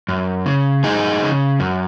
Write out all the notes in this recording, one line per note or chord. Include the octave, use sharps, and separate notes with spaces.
F#2
C#3
F#2 D#4 G#4
C#3
F#2